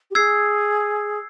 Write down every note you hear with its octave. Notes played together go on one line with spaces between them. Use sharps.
G4
G#4 E6 G#6 C7